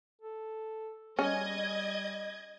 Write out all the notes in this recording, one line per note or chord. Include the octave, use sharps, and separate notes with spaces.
A4
G3 C#4 D#5 G#6